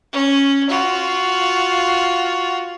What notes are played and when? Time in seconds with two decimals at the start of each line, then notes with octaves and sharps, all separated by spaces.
0.13 C#4
0.69 F4 F#4